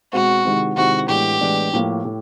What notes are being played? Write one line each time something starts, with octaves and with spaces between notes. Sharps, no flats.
B2 G#3 C4 F#4
C3 D#3 G#3 C4 E4
C3 D#3 G#3 C4 E4 F#4
A2 E3 G#3 B3 D4 G4
A2 E3 G#3 B3 D4
A2 F3 A#3
A2